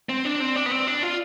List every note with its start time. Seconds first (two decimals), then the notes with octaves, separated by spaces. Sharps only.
0.09 C4
0.25 D4
0.40 C4
0.56 D4
0.66 B3
0.71 C4
0.87 D4
1.03 F4